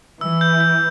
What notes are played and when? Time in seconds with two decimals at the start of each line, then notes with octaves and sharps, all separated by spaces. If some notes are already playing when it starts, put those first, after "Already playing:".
0.21 E3 E6
0.41 G6
0.61 G6